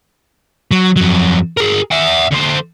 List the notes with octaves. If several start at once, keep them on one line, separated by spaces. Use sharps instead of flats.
F#3
F2 F#3
G#4 A#4
E5 F#5
D3 C5